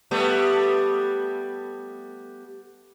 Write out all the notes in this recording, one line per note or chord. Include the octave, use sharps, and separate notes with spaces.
G3 A3 B3